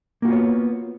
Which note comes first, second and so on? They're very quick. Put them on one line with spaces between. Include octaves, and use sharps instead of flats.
A#3 F#4 F4 B3 C#5